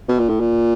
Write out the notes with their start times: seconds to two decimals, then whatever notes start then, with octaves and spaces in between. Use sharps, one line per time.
0.08 B2
0.19 A#2
0.29 A2
0.40 A#2